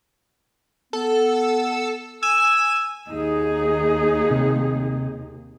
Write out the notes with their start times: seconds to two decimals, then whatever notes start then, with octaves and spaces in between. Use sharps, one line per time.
0.93 B3 A4
2.23 G#5 E6
3.10 D#2 D#4 G#4
4.31 C3